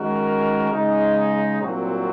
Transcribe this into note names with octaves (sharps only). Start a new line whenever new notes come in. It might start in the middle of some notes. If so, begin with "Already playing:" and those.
Already playing: D#3 G#3 C#4 F#4 A#4
C#3 G#3 D#4 G#4
C2 A#2 F#3 C4 F#4